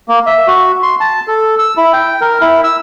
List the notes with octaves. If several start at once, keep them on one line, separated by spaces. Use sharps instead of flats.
A#3
E5
F#4
C6
A5
A4
E6
E4
G5
A#4
E4
E6